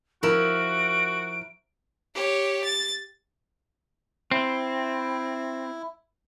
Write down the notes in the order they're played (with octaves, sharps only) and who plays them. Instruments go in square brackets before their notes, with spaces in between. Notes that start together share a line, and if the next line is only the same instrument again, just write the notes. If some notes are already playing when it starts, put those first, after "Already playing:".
[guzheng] F3 E4 [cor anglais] F#4 [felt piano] A#4 [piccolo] D7
[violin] G4 C#5
A6
[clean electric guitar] C4 [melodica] E4